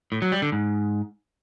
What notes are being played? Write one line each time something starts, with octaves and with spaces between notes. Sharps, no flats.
A2
F#3
G3
D3
G#2